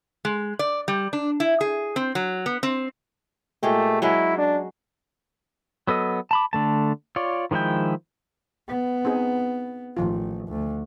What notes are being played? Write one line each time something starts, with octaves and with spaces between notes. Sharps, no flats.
G#3
D5
G3
D4
E4
G#4
C4
F#3
B3
C4
A#2 G#3 A3 G4
F#3 G#3 C#4 E4
D4
F#3 B3 A4 D#5
A5 B5 D6
D3 A3 A5
F4 C#5 D5
D#3 F3 G#3 E4 G5
B3
C4 D#4 G#4
A1 D#3 F3 F4
D2